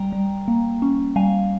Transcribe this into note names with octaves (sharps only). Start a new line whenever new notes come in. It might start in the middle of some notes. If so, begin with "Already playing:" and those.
Already playing: G3 G5 A#5
G3
A#3
C#4
G3 F5 G#5